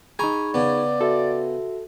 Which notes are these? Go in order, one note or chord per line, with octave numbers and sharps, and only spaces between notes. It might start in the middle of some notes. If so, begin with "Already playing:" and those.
D#4 G#4 G#5 A#5 B5 C#6 G#6
C#3 B3 D5
F#4 A4 E5